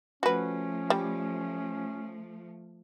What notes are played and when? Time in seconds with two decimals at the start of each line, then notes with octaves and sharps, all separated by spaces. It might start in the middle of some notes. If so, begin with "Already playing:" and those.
0.23 F3 A3 C#4 F#4 B4
0.90 G3